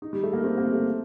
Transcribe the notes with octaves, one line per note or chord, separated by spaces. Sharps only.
D#4
G3
A3
A#3
C4
A#3
A3